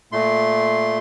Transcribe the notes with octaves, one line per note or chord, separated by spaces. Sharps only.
A#2 A3 C6